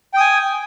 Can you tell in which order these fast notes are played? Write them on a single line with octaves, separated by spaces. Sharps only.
G5 D#6 G#5